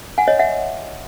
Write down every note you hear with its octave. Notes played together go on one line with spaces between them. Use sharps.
F#5 G#5
C#5 D#5
E5 F#5